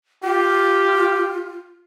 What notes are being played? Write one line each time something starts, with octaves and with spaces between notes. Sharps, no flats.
F4 G4